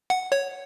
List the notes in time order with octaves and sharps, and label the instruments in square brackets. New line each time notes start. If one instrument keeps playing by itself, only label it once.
[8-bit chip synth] F#5
C#5